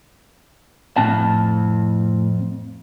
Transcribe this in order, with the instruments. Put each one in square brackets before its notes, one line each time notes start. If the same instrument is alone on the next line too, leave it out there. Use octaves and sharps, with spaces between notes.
[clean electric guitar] F2 C4 A5 [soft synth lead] A2